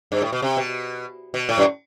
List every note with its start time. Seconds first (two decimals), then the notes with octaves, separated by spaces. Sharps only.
0.12 G2
0.22 A2
0.32 B2
0.42 C3
0.57 B2
1.34 B2
1.49 A2
1.58 F#2